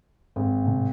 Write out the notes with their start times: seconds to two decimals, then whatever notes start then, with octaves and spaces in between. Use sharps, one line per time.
0.36 G#1
0.65 A2 C3